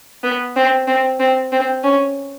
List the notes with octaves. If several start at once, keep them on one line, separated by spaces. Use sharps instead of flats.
B3
C4
C4
C4
C4
C#4